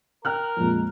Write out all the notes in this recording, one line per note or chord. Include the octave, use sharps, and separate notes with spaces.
A#4 G5 F6 F#6
F2 A#2 G#3